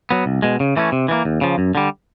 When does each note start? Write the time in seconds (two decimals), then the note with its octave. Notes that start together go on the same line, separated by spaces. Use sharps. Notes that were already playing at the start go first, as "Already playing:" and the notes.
0.11 F#3 B3
0.26 C2
0.42 B2 G#3
0.60 C#3
0.77 E3 A3 C#4
0.92 C3
1.08 E3 G3 A#3
1.25 D#2
1.41 C#3 F3
1.58 F#2
1.75 D3 G3